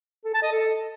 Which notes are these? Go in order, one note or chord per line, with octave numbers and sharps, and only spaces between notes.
A4
A5
D#5
A4